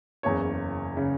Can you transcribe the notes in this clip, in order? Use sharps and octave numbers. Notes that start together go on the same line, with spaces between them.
F#1 E2 C#3 C#5
C#3